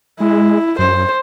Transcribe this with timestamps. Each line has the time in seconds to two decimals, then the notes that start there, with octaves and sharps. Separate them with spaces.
0.20 G#3 E4
0.79 F#2 C5